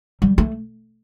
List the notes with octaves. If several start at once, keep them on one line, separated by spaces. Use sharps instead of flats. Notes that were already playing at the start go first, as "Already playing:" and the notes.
G3
A3